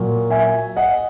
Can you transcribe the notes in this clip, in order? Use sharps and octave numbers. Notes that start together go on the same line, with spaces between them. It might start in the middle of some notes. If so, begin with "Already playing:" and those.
Already playing: A#2 F#3
E5 G#5
D#5 F#5